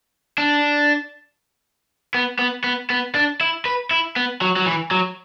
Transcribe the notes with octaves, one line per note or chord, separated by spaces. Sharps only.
D4
B3
B3
B3
B3
D4
E4
B4
E4
B3
F#3
F#3
E3
F#3